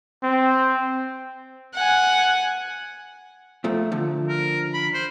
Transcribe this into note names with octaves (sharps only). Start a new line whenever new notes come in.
C4
F#5 G#5
A#2 F3 A3
D3 F3
A#4
B5
C5